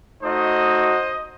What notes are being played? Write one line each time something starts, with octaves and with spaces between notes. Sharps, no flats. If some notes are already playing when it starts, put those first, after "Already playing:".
A3 D#4 F#4 C5 D#5